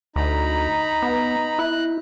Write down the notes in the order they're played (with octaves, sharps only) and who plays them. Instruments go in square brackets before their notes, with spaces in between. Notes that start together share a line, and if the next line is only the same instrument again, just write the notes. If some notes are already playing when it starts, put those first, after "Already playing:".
[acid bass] D2 [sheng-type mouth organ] D#4 A#5 B5
[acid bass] B3
[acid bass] E4 [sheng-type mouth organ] F#6